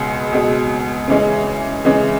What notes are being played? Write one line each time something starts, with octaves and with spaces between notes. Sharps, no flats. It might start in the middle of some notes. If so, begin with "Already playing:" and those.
Already playing: C#2 B2 G#3
C#2 B2 G#3
C#3 E3 G#3 C#4
C#3 E3 G#3 C#4